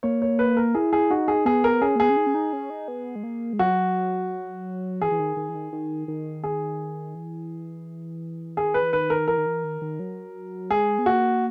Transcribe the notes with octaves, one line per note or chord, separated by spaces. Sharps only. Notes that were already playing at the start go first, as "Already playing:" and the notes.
A#3 C#5
C#5
B4
A#4
E4 G#4
G#4
D#4 F#4
G#4
B3 G#4
A#4
C#4 G#4
A#3
B3 G#4
C#4
D#4
C#4
D#4
C#4
D#4
B3
G#3
A#3
G#3
F#3 F#4
E3 G#4
E3
D#3
D#3
E3
D#3
D#3
D#3
G#4
E3
D#3 G#4
B4
E3
D#3 B4
A#4
E3 A#4
D#3
E3
D#3
D#3
F#3
G#3 G#4
B3
A#3 F#4